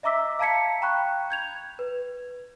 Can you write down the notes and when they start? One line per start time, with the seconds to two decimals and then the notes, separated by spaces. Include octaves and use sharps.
0.03 D#5 E5 A#5 D6 E6 B6
0.39 F5 A5 A#5 G#6 B6 C#7
0.81 F5 G5 A#5 B5 C#6 F#6
1.30 G6 G#6 F7
1.79 B4